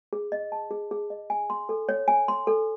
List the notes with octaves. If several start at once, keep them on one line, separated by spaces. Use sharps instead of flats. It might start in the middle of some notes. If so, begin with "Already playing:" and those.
G#4
D#5
A5
G#4
G#4
D#5
G#5
C6
A4
C#5
G#5
C6
A4